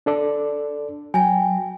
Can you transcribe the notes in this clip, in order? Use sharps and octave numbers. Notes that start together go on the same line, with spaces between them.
D4 A4 D5
F#3 G5 G#5 A#5